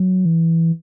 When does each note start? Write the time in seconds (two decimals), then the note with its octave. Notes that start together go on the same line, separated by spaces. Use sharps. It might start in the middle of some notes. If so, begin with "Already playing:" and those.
Already playing: F#3
0.25 E3